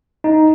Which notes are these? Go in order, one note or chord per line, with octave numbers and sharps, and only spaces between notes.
D#4